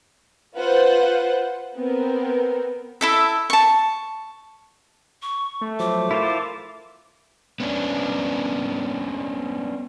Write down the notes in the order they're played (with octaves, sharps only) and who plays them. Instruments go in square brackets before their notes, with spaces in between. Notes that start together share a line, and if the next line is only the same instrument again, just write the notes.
[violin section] F4 B4 C5 F#5
B3 C4 A#4
[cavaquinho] E4 A4 E5
A5 C#6
[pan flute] C#6
[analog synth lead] A3
[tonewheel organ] F3 F#3 C5 [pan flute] D6
[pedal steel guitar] E4 F4 C5 [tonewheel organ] A#4 A5
[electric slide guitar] B3 C#4 D4